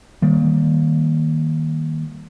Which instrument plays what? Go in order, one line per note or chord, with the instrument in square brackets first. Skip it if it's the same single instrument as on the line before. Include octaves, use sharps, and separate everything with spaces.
[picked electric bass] D#3 G3 A#3